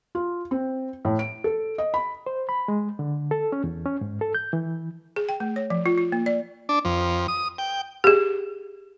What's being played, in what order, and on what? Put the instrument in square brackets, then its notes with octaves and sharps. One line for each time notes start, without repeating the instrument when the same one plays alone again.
[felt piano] F4
C4
A2
D7
A4
D#5
B5
[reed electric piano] C5
B5
G#3
D3
A4
C#4
E2
C#4
G#2
A4
G6
E3
[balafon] G#4
G5
A3
C#5
F3
F4
F4
A#3
D5
[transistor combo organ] D4
F2
D#6
G5
[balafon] G4 G#4